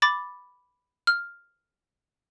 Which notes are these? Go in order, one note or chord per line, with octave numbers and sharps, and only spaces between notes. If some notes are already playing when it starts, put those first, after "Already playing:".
B5 D6 A6
F6